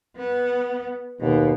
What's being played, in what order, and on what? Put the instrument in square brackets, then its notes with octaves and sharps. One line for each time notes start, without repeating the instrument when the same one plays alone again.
[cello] B3
[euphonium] D#2 [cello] B2